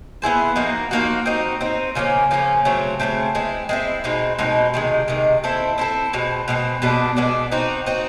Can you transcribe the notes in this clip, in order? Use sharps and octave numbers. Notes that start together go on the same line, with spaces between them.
B3 E4 G#4 C5
F3 A#3 D#4 F#4
F3 A#3 D#4 F#4
C4 D#4 F#4
C4 D#4 F#4
C#3 F3 A#3 C#4
C#3 F3 A#3 C#4
C#3 F#3 A3 C4
C#3 F#3 A3 C4
G#3 C4 E4
G#3 C4 E4
B2 G#3 C4 D#4
B2 G#3 C4 D#4
C3 D#3 G#3
C3 D#3 G#3
C4 E4 A4
C4 E4 A4
B2 G#3 C4
B2 G#3 C4
B2 G#3 B3 D4
B2 G#3 B3 D4
C4 D#4 F#4
C4 D#4 F#4